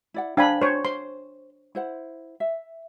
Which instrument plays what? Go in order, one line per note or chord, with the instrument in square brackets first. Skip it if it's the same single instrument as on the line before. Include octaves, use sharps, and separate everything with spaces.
[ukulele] E4 D5 F#5
[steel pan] D4 G#5 B5 [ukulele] C5 F5 G5
[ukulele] D4 [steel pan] C5 C#5
[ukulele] C5 [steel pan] C6
[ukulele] E4 C5 F#5
E5